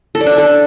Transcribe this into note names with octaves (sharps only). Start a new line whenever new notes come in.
A4
D5
D4
E5
A4